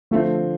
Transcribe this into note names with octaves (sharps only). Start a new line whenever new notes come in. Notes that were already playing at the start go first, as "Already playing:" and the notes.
D3 F3 A3 C4